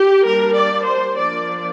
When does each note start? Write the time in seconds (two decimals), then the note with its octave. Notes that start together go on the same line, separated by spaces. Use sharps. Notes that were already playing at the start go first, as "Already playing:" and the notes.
Already playing: G4
0.23 G3 A#3 D4 A#4
0.54 D5
0.84 C5
1.13 F3 A#3 D4 D5